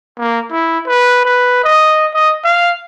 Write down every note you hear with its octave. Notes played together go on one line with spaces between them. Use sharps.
A#3
E4
B4
B4
D#5
D#5
F5